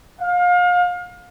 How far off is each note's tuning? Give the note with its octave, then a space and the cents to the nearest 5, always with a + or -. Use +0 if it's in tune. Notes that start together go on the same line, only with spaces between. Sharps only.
F5 +30